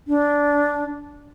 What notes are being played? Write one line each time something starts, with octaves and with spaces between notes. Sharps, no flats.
D4